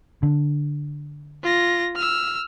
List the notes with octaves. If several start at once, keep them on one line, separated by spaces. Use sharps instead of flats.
D3
F4 A#6
E6 F6